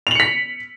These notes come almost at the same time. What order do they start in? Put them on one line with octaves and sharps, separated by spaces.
F7 F#7 C#7 B6